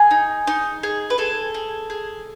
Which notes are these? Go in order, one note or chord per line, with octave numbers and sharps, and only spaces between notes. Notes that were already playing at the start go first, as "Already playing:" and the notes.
Already playing: G#4 G#5
D#4
D#4
G#4
B4
G#4 A4
G#4
G#4